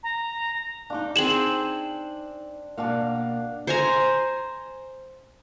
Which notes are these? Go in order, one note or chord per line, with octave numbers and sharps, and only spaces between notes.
A#5
D4 D#4 F5 D6
C4 G#4 E7 F#7
B2 A#3 D4 F5 F#5
C5 G#5 A#5